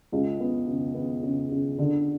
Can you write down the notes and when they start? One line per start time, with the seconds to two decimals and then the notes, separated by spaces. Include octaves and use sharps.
0.12 C#2
0.40 B3
0.68 C#3
0.95 B3
1.23 C#3
1.51 C#3
1.78 D3